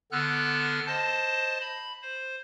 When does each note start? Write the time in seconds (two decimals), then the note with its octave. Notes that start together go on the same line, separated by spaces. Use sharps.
0.12 D3 B3 A4 F6 F#6
0.86 C5 D#5 A5
1.61 B5
2.02 C5